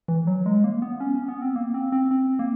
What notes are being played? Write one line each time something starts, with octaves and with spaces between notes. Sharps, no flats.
E3
F#3
G#3
A#3
B3
C#4
C#4
B3
C4
A#3
C4
C4
C4
A#3